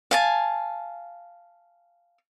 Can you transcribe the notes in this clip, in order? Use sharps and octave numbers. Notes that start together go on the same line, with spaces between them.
F5 G#5 A5